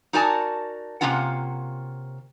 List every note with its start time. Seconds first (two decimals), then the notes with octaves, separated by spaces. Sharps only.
0.13 D#4 F#4 A#4 D5 G#5 A5
1.01 C3 F3 A#3 C#4 F4 F#5